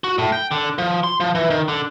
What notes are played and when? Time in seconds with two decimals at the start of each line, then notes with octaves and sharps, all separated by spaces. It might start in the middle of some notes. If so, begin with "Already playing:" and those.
0.04 F#4
0.18 A2
0.32 G5
0.51 D3
0.78 F3
1.04 C6
1.20 F3
1.35 E3
1.50 D#3
1.68 D3